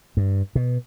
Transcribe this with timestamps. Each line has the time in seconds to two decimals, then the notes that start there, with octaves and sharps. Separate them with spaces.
0.17 G2
0.55 B2